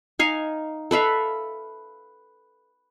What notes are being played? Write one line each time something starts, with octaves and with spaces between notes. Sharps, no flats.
D#4 F5 G#5
A4 B4 E5 F5